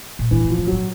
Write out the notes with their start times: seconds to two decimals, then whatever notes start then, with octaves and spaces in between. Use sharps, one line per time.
0.19 A#2
0.31 A2 E3
0.45 B2
0.50 F3
0.58 C3
0.67 F#3
0.72 A2